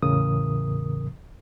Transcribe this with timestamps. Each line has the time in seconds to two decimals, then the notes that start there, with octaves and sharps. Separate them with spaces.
0.02 E2 A2 C#3 E3 A#4 D#6